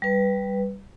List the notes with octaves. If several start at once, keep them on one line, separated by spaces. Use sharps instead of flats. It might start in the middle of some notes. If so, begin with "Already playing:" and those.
G3 B4